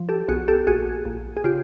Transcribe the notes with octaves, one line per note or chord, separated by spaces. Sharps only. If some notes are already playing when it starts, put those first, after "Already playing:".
Already playing: F3
G4 A4
B1 F#4 G#4
G4 A4
A#1 F#4 G#4
A#1
G#4
C#3 F4 G4